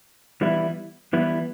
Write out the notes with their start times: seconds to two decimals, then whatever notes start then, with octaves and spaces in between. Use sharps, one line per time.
0.41 E3 G3 B3 E4
1.13 E3 G3 B3 E4